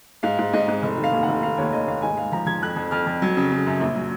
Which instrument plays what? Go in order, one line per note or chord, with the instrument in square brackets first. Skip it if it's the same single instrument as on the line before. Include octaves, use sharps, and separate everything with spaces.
[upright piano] G#2 F5
G#2
G#2 D#5
G#2
F1
D#3
F5
D#2
F#5
F1
D#3 F5
D#2 C#5
D#2 D#5
D#2 F5
G#2 G#5
G#3 F5
F3 A#5
F3 G#6
F2 F#6
F2
F2 F6
F2
F#3
C#3
C#3
F#2
A#1
F#3